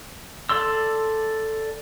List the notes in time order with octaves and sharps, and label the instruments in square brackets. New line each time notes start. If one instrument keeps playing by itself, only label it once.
[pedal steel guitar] A4 D5 C6 E6